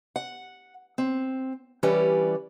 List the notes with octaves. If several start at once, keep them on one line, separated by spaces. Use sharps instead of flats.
F#5
C4
E3 G3 C#4 G4 B4 D5